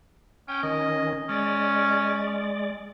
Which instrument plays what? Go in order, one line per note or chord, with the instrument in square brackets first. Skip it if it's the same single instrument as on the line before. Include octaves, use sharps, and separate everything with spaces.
[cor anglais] C#4 [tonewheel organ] G5
[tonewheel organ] D#3 C#4 [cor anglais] D#5
[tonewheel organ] G#3 D5 [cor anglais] C#4